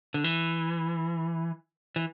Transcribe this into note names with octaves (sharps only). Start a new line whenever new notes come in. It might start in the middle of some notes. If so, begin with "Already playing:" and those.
D3
E3
E3